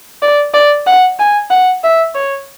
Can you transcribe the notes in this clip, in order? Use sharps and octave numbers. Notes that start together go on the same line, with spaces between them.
D5
D5
F#5
G#5
F#5
E5
C#5